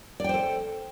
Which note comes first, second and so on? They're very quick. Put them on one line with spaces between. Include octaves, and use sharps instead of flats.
D5 G5 C5 A4